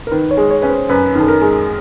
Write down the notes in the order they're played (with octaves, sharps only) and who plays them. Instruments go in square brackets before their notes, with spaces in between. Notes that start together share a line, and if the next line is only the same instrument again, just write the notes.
[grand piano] A#4
[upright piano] D#3 [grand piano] B4
[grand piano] C#5
[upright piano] G#3
[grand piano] C#5
[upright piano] C#4 [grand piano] B4
[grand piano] C5
[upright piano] F#2 [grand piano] B4
[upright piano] D#3 [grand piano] A4
[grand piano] A#4
[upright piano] G#3